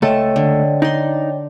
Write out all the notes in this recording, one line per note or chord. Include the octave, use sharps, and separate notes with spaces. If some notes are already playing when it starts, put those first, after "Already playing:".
C#2 A3 C#5 D#5 G5 A5
D3
D#4 D5 C6